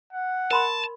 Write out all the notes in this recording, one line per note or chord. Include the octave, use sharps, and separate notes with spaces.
F#5
A#4 A5 B5 C6